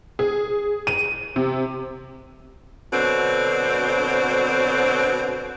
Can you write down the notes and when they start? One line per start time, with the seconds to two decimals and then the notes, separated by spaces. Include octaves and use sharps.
0.19 G#4
0.87 D#7
1.36 C3
2.93 B2 D3 F#3 C4